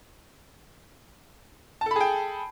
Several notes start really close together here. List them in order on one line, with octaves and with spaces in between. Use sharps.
A5 A4 B5 G#4 G5